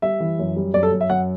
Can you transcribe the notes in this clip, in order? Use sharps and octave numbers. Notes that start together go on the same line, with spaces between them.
G3 E5
E3
F#2
G3
F#2 D5
A4
F#2
E5
F#2 F#5